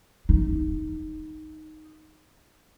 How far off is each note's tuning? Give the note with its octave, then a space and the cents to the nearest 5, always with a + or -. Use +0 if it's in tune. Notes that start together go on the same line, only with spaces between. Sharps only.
D#4 +0